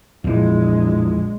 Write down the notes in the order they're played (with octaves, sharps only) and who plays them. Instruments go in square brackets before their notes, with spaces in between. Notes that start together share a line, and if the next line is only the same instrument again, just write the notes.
[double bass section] A#1 G#3 [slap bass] F2 E3